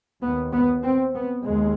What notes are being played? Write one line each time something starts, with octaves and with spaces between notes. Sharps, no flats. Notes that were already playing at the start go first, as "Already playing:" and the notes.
D#2 B3
B3
C4
B3
D#2 G#3